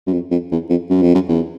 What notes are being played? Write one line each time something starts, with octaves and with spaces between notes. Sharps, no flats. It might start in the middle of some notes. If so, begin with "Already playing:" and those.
F#2
F2
F2
E2
F2
F#2
F2
F#2
E2